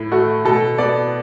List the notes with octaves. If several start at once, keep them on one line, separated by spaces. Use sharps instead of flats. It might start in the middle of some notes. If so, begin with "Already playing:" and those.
Already playing: A2
A3 F#4
B2 A4
B3 D5